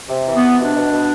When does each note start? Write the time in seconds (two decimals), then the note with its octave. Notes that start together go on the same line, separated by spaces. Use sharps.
0.09 C3
0.26 E3
0.35 B3
0.43 C3
0.59 B2 D4
0.76 B2
0.92 B2